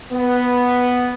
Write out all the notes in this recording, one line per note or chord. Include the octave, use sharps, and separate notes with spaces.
B3